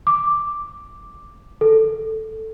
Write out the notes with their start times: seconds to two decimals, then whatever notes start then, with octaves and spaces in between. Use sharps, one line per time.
0.07 D6
1.61 A4